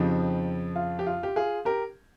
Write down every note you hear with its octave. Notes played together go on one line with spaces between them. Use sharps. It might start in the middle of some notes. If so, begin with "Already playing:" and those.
Already playing: F2 C#3 F3 C4 D#4 G4
F4
G4
F4
G4
F4 G#4
G4 A#4